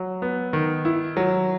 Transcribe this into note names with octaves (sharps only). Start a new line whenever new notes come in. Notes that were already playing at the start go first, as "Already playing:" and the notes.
Already playing: F#3
B3
D#3
E4
F#3